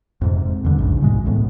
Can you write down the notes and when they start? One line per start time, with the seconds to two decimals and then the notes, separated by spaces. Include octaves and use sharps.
0.21 F2 G#2 C3
0.64 E2 G2 D3
0.78 A#1 G#2 C#3
1.01 G#2 B2 E3 G#3
1.26 C#2 A2 B3